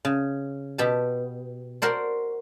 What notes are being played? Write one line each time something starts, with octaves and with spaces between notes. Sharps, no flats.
C#3
B2 G4 A5
F#4 A#4 C5 D5